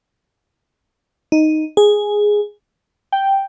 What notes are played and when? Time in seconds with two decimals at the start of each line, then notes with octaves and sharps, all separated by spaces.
1.32 D#4
1.77 G#4
3.12 G5